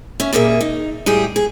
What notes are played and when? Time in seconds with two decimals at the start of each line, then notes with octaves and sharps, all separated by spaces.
0.20 C#4 E5
0.33 A#2 G3 A#3 G#4 E5
0.61 D#4
1.06 A2 G3 G4 G#4
1.36 G#4